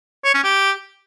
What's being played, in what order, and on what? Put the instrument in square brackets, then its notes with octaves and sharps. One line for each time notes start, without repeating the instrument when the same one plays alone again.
[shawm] C#5
C#4
G4